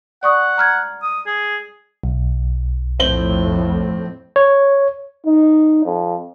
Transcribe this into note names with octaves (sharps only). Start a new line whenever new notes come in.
D5 F#5 C#6 D#6
A#5 F6 G#6
D#6
G#4
B1
F2 A2 C4 F#7 G7
C#5
D#4
F2